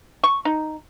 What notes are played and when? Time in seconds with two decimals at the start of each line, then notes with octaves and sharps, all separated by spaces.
0.24 C#6
0.45 D#4